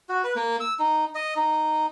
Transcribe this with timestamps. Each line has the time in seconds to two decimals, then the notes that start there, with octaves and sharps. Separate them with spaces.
0.09 F#4
0.24 B4
0.36 A#3
0.60 E6
0.79 D#4
1.15 D#5
1.36 D#4